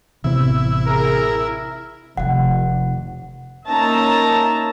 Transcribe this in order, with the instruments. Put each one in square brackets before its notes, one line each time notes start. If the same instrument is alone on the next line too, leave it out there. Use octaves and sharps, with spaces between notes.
[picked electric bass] A1 E3 B3 [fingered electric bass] C3 [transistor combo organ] E4
[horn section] G#4 A#4
[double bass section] F1 [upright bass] C3 D#3 [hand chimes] F#5
[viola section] A#3 C#4 D#4 E5 A5 A#5